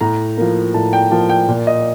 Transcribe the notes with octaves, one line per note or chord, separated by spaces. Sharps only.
A2 A#5
F3 A#3
A2 A5
G5
F3 A#3 A5
G5
A#2
D#5